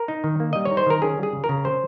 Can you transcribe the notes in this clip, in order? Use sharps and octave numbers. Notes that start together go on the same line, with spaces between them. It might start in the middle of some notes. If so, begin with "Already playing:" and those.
Already playing: A#4
D#4
D#3
A#3
G3 D#5
C#5
D#4
C5
D#3 A#4
C#4 G#4
G3
G#4
C#3
A#4
C#3
C#4 C5